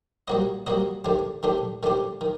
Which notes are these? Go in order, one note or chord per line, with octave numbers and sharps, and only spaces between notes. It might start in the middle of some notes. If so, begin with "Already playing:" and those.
G3 A#3 F#4 C5 D#5
G3 A#3 F#4 C5 D#5
D#3 A3 D4 G4 C5
D#3 A3 D4 G4 C5
D#3 A3 D4 G4 C5
D#3